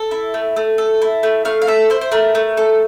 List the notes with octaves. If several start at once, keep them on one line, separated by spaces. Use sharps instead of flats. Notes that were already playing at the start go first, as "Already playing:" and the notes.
Already playing: A4
E4
A3
A3
A4
E4
A3
A3 F5
F5
A4 E5
E4 C5
C5
A3 A#4
A3
A4